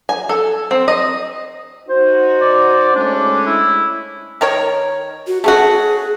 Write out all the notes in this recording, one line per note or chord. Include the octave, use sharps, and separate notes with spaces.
G#5
A4
C4
D#5
D#4 F#4 C5
D5
G#3 A3 C#4 D4
E4
D#3 A#4 C#5
F#4
A3 C#4 F#4 G#4